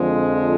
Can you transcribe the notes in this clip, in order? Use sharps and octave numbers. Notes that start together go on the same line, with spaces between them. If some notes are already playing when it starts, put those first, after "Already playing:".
Already playing: F2 D3 F3 G#3